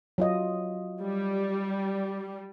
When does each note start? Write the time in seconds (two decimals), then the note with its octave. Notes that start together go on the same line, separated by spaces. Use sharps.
0.18 F#3 F4 D#5
1.02 G3